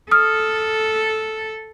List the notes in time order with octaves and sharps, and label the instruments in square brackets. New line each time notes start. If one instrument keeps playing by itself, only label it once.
[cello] A4 [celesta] D#6 F6